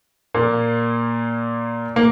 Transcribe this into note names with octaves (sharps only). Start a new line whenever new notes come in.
A#2 A#3
A#3